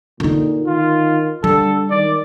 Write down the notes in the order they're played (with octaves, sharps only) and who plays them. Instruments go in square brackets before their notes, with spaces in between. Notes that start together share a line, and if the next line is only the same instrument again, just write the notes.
[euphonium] A#2 [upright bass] D3 D#4
[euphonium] D#3 [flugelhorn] F4
[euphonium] D3 [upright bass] G3 [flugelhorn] A4
[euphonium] D#3 [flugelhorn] D5